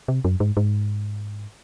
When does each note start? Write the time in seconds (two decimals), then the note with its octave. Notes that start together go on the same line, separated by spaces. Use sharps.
0.08 C3
0.25 F#2
0.40 G#2
0.57 G#2